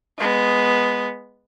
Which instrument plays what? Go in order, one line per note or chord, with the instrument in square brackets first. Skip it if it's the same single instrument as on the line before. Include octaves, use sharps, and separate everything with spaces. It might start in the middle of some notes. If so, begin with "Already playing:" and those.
[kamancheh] G#3 B3